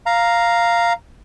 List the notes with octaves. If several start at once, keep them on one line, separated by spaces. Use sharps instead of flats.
F5 A#5